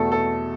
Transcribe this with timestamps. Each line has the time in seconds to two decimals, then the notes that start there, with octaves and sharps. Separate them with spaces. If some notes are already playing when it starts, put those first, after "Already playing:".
Already playing: E2 B2 A3 A4
0.12 A4